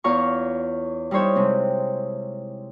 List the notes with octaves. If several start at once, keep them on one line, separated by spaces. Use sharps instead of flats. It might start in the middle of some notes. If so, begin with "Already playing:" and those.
E2 F4 C#5 F5 A#5 C#6
G3 D#4 E4 C5 C#5 E5
C3 G#3 C4